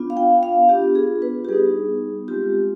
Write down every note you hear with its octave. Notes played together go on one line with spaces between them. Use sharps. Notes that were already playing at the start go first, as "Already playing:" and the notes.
Already playing: B3 D4 F4
F5
G5
F5
B3 D4 F4 G4
G#4
B4
G4
G3 B3 D#4 G#4
G#3 C4 F4 G4